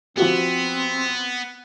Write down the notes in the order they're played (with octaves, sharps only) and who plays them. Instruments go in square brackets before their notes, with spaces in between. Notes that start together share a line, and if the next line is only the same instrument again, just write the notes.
[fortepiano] F3 F#4 G4 [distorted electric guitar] B3 [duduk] C4